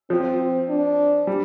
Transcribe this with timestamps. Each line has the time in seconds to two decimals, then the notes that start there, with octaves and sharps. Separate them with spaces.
0.10 F3 C4
0.69 D4
1.27 G3